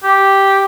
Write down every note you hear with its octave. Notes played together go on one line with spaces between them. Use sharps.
G4